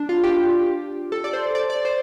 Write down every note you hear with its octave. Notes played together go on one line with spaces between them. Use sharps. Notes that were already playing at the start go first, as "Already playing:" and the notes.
Already playing: D4
F4
G4
A4
D5
C5
D5
D5
C5